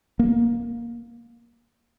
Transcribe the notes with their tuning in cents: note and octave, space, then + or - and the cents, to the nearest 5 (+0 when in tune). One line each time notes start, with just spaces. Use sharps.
A#3 +15